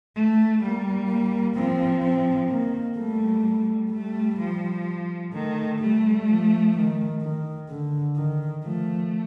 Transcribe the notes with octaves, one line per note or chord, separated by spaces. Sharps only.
A3
G3 A#3
A#3
F3 C4
C4
D#3 A#3
G3 A3
G3 A3
F3
D#3 A3
G3 A3
F3
D#3
D#3
D3
D#3
F3 A3